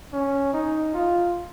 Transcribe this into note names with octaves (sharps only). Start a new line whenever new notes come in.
C#4
D#4
F4